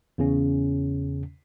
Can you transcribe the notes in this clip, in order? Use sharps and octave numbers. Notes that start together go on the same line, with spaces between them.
E2 C#3 C#4